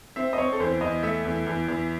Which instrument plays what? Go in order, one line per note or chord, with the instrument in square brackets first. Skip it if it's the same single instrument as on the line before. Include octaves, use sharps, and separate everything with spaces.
[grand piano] C4 E5
D#5
C4 C#5
A4
E2 C5
E2 D#5
A3 E5
E2
E2
E2